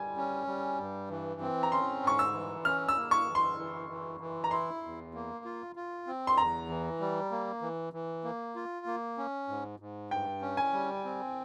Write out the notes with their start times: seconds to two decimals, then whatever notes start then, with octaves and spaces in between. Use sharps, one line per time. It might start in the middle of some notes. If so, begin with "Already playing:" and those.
Already playing: G3 G#5
0.17 C#4
0.47 G3
0.79 G2
1.10 E3
1.41 C4
1.63 A#5
1.71 C#4 C6
2.03 G#2 C#6
2.19 E6
2.34 E3
2.65 C#4 F6
2.89 E6
2.96 A#3
3.11 C#6
3.28 E3
3.35 C6
3.58 E3
3.89 E3
4.20 E3
4.44 A#5
4.51 E4 C6
4.83 E2
5.14 A#3
5.45 F4
5.76 F4
6.07 C4
6.27 C6
6.38 E2 A#5
6.69 E3
7.00 G3
7.31 A#3
7.62 E3
7.93 E3
8.24 A#3
8.56 F4
8.86 A#3
9.18 C#4
9.48 G#2
9.80 G#2
10.11 G2 G5
10.41 C#4
10.57 G#5
10.73 G3
11.04 C4